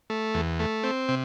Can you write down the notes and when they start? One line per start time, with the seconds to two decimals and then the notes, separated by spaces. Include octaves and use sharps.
0.10 A3
0.34 E2
0.60 A3
0.84 C4
1.08 C3